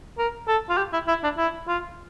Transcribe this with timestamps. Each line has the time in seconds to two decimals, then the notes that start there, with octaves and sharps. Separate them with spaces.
0.18 A#4
0.48 A4
0.70 F4
0.78 G4
0.93 E4
1.08 E4
1.24 D4
1.38 E4
1.68 F4